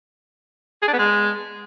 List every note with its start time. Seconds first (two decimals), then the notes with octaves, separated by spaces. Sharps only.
0.82 G#4
0.88 D4
0.93 B3
0.99 G#3